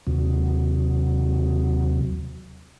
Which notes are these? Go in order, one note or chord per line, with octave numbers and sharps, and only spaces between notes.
D#2 C3 F#3